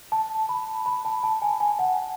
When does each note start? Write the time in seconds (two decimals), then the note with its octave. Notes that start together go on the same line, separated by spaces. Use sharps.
0.12 A5
0.49 B5
0.86 B5
1.05 A5
1.23 A5
1.42 G#5
1.60 G#5
1.79 F#5